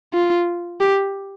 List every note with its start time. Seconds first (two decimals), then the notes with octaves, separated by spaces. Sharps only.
0.14 F4
0.81 G4